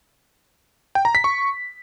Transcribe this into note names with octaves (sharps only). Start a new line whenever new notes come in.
G5
A#5
B6
C#6